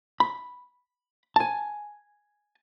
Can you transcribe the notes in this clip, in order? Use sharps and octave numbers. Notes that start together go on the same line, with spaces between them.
B5
G#5 A5